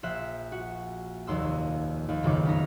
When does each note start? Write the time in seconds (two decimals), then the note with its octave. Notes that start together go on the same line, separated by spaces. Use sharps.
0.03 A#1 C5 E5 F#6 E7
0.52 F#4
1.27 F1 D#2 C6 E6
2.08 D#2
2.23 F#1 B1 F2 D#3 D6
2.45 B3 D#4 A#5